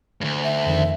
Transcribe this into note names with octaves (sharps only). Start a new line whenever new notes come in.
D2 G2
E5
F2 D#3